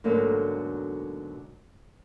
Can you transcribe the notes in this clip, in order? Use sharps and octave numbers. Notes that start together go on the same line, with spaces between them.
G#2 B2 D3 F#3 A3 A#3